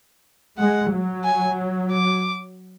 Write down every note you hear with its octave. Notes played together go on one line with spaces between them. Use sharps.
G#3 F#5
F#3
G#5
D6